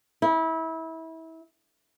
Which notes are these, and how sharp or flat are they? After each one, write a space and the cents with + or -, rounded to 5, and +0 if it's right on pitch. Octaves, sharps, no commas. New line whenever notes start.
E4 -25